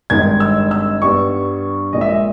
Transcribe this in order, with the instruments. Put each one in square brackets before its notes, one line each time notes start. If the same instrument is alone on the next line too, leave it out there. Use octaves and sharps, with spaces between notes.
[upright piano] G#1 G2 D#3 G#3 G#6
E6
E6
G2 G3 B3 C#6
A#1 A#2 G#3 D#5
E5
D#5